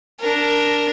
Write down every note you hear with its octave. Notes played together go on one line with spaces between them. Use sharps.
D4 A#4